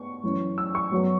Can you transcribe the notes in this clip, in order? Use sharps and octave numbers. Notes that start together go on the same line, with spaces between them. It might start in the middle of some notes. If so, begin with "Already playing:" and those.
Already playing: B3 C#6
F#2 E3 C#4
E6
C#6
F#2 F#3 B3